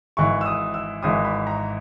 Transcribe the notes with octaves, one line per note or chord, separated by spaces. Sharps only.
G#1 G#2 E3 C#6
E6
D#6
E6
G#1 G#2 E3 D#6
B5
A#5